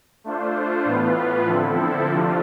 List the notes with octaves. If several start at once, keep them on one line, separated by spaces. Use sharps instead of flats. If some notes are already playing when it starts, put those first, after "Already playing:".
A3 D4 F4 C5
A2 E3 B3 F4 B4
D3 F3 C4 E4 A4
C3 F3 A3 D4 F4